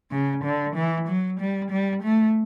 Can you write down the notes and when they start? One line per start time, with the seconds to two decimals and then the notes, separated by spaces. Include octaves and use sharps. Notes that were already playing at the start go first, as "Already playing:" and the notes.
0.11 C#3
0.44 D3
0.76 E3
1.08 F#3
1.40 G3
1.71 G3
2.03 A3